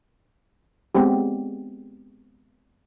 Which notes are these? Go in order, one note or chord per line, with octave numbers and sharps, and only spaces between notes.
G#3 B3 C4 G4